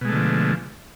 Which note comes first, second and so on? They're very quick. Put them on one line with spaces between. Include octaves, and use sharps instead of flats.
B2 G#3 A3 D3 F3